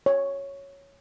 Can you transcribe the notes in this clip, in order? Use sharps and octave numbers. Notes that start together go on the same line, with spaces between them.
C#5